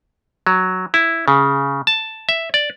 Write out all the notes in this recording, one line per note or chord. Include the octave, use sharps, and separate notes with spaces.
F#3
E4
C#3
A5
E5
D5